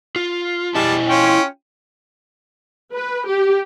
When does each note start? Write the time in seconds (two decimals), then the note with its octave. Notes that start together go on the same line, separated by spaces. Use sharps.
0.16 F4
0.74 G3 E4 D#5 G#5 A5
1.08 C#4 F4 G5
2.93 B4
3.27 G4